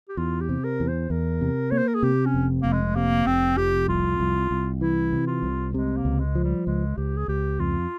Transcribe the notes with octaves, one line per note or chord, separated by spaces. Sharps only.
G4
E2 F4
G4
C3
A#4
E2
C5
E2 A#4
C3
A#3 C#5
C5
A#4
G#4
C3 G4
C#4
F1
F1 A#3
G#3
C3 A#3
F1 C4
F2 G4
C2 F4
C2
C2
E3 E4
C3
F4
C2
C3 G#3
A#3
C#2
G#3
F3
G3
C#2 G#3
C#2 G4
G#4
C#2 G4
F2 F4